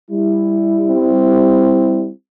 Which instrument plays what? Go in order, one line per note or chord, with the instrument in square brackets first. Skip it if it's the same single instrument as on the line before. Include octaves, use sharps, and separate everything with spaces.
[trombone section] G3 E4
[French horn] C4